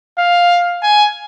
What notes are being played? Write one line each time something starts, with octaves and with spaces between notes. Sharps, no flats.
F5
G#5